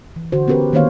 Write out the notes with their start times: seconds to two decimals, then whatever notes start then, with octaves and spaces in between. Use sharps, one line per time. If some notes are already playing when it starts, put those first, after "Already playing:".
0.16 E3
0.32 D3 F#4 C5
0.48 B3 C#4 G4 A#4 B4
0.73 D#3 A#3 C4 C5 C#5 F5